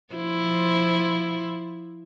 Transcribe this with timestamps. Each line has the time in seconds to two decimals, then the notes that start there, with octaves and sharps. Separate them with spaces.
0.14 F3 E4 C5